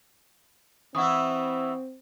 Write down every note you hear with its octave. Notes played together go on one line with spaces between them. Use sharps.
E3 C4 E4 F#5 C#6 D#6